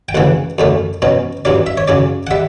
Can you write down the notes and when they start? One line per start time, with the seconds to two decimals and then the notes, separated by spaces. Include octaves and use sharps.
0.09 G5
0.15 D2 C#3 E3 F#5
0.58 F#2 D3 A3 C#4
1.02 B2 F#3 C#4
1.45 G2 F#3 C#4 D5
1.66 E5
1.77 C#5
1.88 C#3 F#3 C#4 D5
2.27 F#5
2.31 G3 E5